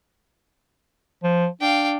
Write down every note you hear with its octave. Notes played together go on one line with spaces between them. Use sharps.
F3
D4 F5 G5